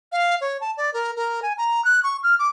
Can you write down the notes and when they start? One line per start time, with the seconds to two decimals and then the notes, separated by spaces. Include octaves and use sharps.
0.12 F5
0.41 C#5
0.61 A5
0.77 D5
0.94 A#4
1.16 A#4
1.42 G#5
1.58 A#5
1.85 F#6
2.04 C#6
2.23 F6
2.39 D6